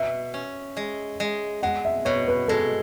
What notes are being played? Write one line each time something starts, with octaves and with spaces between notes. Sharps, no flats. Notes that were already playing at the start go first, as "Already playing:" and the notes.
Already playing: B2 E5
C#4
G#3
G#3
G#3 F#5
E5
B2 C#5
B4
G#3 A4